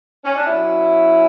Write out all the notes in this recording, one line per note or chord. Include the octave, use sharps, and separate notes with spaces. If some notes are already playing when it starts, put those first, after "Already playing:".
C#4
D4
B2 F#3 C#4 E4